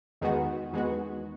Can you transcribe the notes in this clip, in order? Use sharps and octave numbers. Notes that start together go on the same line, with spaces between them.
E2 D#3 G#3 B3 F#4
E2 D#3 G#3 B3 F#4